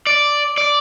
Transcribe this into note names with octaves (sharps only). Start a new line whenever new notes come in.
D5
D5